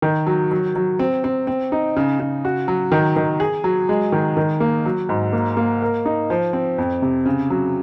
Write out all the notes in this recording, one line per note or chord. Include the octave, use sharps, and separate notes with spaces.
D#3
F#3
F#3
F#3
C4
C4
C4
D#4
C#3
C#3
F#4
F#3
D#3
D#3
G#4
F#3
G#3
D#3
D#3
A#3
F#3
G#2
A#3
A#3
A#4
D#4
F3
C4
F2
C3
C#3
F#3